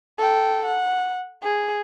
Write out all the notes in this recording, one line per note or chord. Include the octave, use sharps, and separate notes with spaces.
A4 G5
F#5
G#4